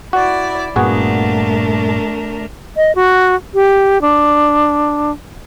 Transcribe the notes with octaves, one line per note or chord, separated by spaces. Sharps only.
E4 F#4 D5
G2 A#2 A3 B3 D4 F#4 G#4 A#4
D#5
F#4
G4
D4